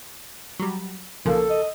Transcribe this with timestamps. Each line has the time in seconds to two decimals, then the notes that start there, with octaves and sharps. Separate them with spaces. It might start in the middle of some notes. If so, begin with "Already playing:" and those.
0.60 F#3 G3
1.26 B1 C#3 F3 A#3 A4
1.50 D#5